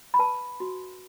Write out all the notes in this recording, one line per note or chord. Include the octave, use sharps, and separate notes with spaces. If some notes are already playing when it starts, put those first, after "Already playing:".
B5
B4 A5
F#4